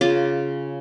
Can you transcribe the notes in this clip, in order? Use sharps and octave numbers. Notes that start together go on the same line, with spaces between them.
C#3 F4 D6